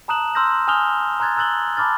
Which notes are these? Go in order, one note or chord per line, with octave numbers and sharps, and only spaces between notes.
A5 A#5 D#6 F#6 E7 F#7
C6 E6 F6 G6 A#6
G#5 D#6 F6 G6 F7 G7
A#5 C6 F#6 G#6 A6
A#5 E6 F#6 A6 F#7 G7
A5 B5 D6 F6 A6